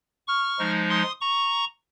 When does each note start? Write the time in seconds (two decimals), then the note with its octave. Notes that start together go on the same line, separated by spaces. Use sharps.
0.27 C#6 F6
0.59 F3 G#3 D#4
0.89 C6 D#6
1.21 A#5 C#6